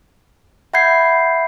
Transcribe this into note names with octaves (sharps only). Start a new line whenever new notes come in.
E5 F#5 B5 G6 G#6 C7